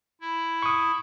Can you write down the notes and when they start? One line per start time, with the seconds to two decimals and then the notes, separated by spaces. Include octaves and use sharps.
0.21 E4
0.62 C#6 D#6